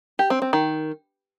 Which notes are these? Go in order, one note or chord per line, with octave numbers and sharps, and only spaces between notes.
G4
C4
C4
D#3